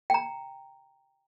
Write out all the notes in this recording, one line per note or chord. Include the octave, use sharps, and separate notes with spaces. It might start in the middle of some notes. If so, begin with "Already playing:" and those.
G5 A#5